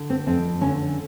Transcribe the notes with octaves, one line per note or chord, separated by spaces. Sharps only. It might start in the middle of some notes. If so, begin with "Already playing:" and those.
Already playing: D3
C4
F2 C4
D3 C#4